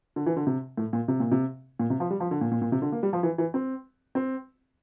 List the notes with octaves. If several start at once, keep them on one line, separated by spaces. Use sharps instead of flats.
D3
E3
D3
C3
A2
A#2
C3
A#2
C3
A#2
C3
F3
G3
F3
D3
A#2
A#2
A#2
C3
D3
A#3
G3
F3
E3
E3
C4
C4